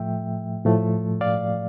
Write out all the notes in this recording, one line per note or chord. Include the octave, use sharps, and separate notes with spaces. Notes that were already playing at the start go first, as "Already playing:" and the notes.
Already playing: A2 F3 A3 E5 G5
A2 F3 A3
D5 F5